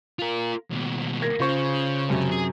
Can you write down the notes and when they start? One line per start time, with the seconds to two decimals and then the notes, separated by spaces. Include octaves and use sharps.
0.19 F4 A#4
0.71 D#2 B2
1.22 A#3 G#6 A#6
1.40 C#3 F4 C5 C#6
2.09 F#2 C3
2.32 G#4